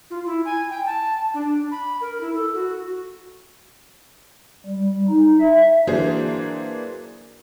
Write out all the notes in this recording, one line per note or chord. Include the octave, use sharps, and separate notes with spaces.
F4
E4
G#5
G5
A5
D4
B5
A#4
E4
A4
F#4
G3
D#4
E5
E3 F#3 A#3 D4 G#4 C5